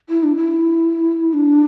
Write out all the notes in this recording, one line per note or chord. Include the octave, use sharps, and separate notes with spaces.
E4
D4
E4
D4